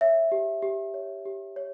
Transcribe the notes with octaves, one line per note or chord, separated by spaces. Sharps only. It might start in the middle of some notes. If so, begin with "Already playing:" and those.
C#5 E5
G4
G4
C#5
G4
C#5